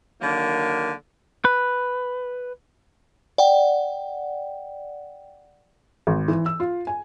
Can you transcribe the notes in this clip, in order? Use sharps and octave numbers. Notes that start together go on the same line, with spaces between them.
D3 D#3 F#3 A#3
B4
D5 F#5 G5
G#1
E3
E6
F4
G#5